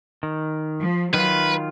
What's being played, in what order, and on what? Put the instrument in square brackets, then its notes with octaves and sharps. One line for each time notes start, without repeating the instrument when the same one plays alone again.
[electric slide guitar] D#3
[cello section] F3
[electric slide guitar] D#3 F4 [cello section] F#3 [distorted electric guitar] B4